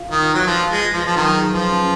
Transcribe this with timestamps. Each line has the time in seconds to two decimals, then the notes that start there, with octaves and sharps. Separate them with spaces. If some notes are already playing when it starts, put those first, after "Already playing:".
Already playing: F4 F5
0.11 D#3 F4
0.28 B4
0.34 F#3
0.47 F3 F4
0.63 F5
0.70 G#3
0.81 F4
0.93 F3
0.99 B4
1.06 F3
1.16 D#3 F#3
1.33 G#4
1.52 F3 B4
1.69 C#4